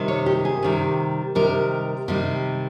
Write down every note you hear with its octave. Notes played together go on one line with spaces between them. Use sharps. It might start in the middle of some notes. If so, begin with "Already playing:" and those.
Already playing: C3 D#3 G3
C#5
G4
G#4
C3 D#3 G3
C3 D#3 G3 A#4
C3 D#3 G3